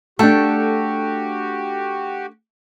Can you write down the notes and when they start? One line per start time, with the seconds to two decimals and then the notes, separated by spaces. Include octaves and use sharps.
0.19 A3 D4 F#4 G4 A4 G5